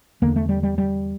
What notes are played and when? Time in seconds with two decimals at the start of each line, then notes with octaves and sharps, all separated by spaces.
0.22 E2 D3 A#3
0.36 A3
0.49 G3
0.63 G3
0.78 G3